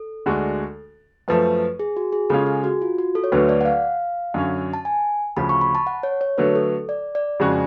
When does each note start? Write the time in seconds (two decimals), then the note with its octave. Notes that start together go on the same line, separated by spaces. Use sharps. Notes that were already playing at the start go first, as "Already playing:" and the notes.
Already playing: A4
0.26 D2 D3 G#3 D4 F#4
1.28 F#2 F3 A3 B4
1.79 G#4
1.97 F#4
2.12 G#4
2.30 C#3 G#3 C#4 F4 A4
2.46 G#4
2.64 F#4
2.82 F4
2.98 F#4
3.15 A4
3.24 C#5
3.32 D2 D3 F#3 A3 B4
3.49 D5
3.61 F#5
3.65 F5
4.34 F#2 D3 F#3 C#4
4.74 A5
4.85 G#5
5.36 D2 C#3 F3 B5
5.49 C#6
5.61 B5
5.75 A5
5.87 F#5
6.03 C#5
6.21 C#5
6.38 D3 F#3 A3 B4
6.55 A4
6.89 D5
7.15 D5
7.40 F2 C#3 G#3 C#4 F#4